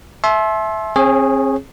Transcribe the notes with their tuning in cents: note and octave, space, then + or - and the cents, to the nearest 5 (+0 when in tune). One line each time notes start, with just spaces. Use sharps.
E5 +0 A5 -40 C6 +25
C4 +35 G#4 +0 C#5 -25